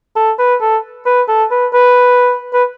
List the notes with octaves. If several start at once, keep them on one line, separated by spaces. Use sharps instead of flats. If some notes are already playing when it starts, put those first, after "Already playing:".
A4
B4
A4
B4
A4
B4
B4
B4